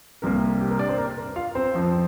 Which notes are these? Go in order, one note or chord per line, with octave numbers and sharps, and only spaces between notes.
C2 C3 A#3 A#4
G4
A#4
D4 D5
C4 C5
A#4
A#4
F4 F5
C4 C5
F2 F3 C4